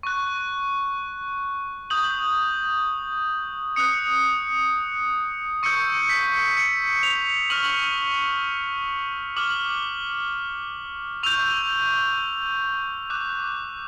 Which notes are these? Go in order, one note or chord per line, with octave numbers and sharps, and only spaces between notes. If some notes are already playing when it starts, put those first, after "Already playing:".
C#6 F#6
D#6 G6 F#7
D#6 F#6 C#7
C#6 E6 G6 C#7
B6
C#7
F7
C#6 F6 F#7
D6 F6 F#7
C#6 E6 G6 F7
D6 F#6